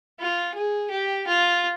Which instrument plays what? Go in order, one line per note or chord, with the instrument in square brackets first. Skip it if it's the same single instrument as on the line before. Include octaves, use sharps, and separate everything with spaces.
[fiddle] F4
G#4
G4
F4